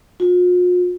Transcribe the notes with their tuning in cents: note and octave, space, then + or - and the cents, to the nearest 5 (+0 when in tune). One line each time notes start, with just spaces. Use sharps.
F4 +45